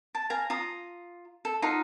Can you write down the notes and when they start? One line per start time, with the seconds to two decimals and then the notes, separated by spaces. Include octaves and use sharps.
0.15 A5
0.30 F5 G#5 A#5
0.50 F4 A#5 D#6
1.45 A4
1.62 D#4 F4 F#5